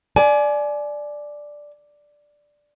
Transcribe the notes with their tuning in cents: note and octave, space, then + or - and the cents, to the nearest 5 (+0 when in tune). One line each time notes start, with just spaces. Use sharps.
D5 +0 G#5 +30